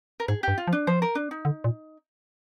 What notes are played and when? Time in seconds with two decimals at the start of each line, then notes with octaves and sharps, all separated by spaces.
0.20 A#4
0.28 G#2 G#4
0.43 G2 G4
0.58 F4
0.67 F3
0.73 D4
0.87 F3 C5
1.02 A#4
1.15 D4
1.31 D#4
1.45 D3
1.64 A#2